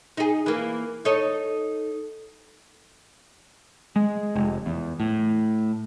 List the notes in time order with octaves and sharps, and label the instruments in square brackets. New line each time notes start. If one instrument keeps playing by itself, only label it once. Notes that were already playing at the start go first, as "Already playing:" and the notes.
[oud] D#4 G#4
E3 A#3
D#4 A4 C#5
[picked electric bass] G#3
F1
E2
A2